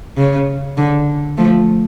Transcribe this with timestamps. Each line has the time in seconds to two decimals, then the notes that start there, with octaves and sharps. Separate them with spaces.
0.18 C#3
0.78 D3
1.38 F3 A3